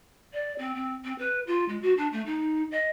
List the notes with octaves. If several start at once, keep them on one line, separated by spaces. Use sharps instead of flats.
D5
C4
C4
C4
B4
F4
G#3
F#4
D4
A3
D#4
D#5